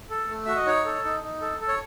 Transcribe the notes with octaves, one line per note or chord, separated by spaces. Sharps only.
A4
A3
F#4 E5
D#5
D#4 C#5
A4
D#4
D#4
A4
A4
C#5